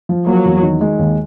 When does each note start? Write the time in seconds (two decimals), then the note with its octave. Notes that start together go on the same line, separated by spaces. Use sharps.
0.09 F3
0.27 F#3 A#3
0.45 E2
0.63 D#3
0.81 G#3
0.99 D#2